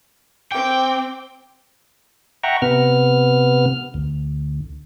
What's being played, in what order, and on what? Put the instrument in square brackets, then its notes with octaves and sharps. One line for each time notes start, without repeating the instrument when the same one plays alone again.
[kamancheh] C4 D6 [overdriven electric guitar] G5
[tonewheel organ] E5 F#5 G5 A#5 C#6
C3 B3 F6
D2